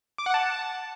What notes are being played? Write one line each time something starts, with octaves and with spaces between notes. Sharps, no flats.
D6
F#5
A5